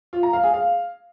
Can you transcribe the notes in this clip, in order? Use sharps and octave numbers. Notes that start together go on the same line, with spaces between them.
F4
A#5
F5
G#4
F5